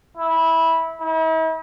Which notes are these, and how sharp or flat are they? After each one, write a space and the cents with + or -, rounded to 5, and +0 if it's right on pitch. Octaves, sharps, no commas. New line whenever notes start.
E4 -15
E4 -45